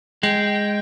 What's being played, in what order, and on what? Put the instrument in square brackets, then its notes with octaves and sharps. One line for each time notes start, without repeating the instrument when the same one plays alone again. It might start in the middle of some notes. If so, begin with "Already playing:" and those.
[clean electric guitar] G#3 [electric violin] G5